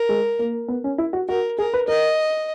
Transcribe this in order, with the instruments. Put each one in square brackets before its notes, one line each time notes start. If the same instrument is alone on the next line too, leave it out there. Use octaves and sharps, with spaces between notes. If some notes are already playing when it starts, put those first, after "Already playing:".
Already playing: [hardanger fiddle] A#4
[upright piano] G#3
A#3
B3
C#4
E4
F#4
[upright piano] F#4 [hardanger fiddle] A#4
[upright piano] G#4 [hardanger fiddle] A#4
[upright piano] B4
[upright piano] A#4 [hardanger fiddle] D#5